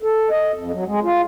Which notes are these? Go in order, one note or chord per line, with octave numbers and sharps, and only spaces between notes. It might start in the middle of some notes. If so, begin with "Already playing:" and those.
A4
D#5
F2
F#3
G#3
F4